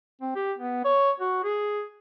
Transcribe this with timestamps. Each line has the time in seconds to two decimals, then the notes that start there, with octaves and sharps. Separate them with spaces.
0.21 C4
0.36 G4
0.58 B3
0.84 C#5
1.20 F#4
1.44 G#4